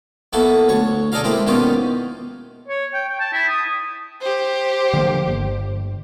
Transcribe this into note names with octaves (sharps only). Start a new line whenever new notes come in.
A#3 B3 E4 F#4 A4
D2 C#5 C#6
G#4 A4 D5 D#5 F5 A#5
G#3 A#3 C4 E4 G4
B2 D#3 C#4 D#4 F4 G4
C#5
G5
G5
A5
E4
D#6
G4 C5
D3 F3 A#3
G1